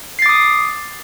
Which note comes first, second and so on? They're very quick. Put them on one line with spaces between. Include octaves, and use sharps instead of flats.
C7 A6 D6 D#6